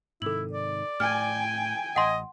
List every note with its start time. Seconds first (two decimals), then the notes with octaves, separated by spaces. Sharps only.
0.22 G#2 C3 D#3 E4 A4 F#7
0.53 D5
1.00 A2 G5 G#5 F6
1.96 A1 D#5 F#5 C6